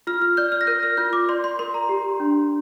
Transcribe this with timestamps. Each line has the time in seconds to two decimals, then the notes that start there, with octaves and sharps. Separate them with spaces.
0.07 F4 F6
0.22 F6
0.37 D5 G6
0.52 F6
0.61 A#6
0.67 A#4 G6
0.83 F6
0.97 F4 G6
1.13 D6
1.29 D5 C6
1.44 C6
1.59 A#4 C6
1.74 A#5
1.89 G4
2.20 D4